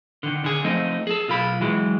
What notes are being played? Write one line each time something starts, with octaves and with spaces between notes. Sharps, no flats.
D3 D#3
D3 G#4
F3 A3 C4 D#4
G#4 A4
B1 F4 B5
E3 F#3 G#3